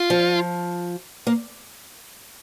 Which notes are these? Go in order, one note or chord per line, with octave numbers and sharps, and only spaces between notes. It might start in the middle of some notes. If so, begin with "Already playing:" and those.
Already playing: F4
F3
A#3